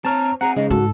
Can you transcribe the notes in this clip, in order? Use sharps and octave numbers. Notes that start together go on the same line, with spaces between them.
C4 C#5 A5 A#5 F6
C4 G#4 F#5 A#5
C#3 G#3 D#4 D#5
G#2 F#4 A4